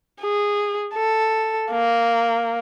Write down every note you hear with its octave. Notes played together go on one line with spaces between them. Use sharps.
G#4
A4
A#3